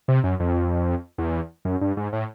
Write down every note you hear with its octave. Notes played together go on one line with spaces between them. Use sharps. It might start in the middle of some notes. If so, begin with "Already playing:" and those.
C3
F#2
F2
E2
F#2
G2
G#2
A2